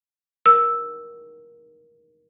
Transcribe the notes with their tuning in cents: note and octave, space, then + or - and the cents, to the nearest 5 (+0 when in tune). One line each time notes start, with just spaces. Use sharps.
A#4 +20 E6 +0